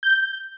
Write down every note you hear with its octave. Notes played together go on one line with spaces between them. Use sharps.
G6